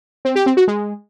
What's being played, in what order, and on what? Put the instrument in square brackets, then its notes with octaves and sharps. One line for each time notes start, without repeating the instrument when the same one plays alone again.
[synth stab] C4
G4
C4
F#4
G#3